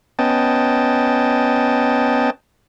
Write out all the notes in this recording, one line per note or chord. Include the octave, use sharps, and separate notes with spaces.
B3 C#4 D#5 G5 A5